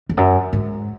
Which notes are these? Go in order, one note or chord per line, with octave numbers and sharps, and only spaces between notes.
F2
F#2
G#2